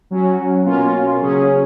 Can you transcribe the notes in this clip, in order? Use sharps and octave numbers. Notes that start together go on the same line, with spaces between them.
F#3 C#4 F#4
B2 A#3 C#4 F4
C#3 F#3 C#4 G#4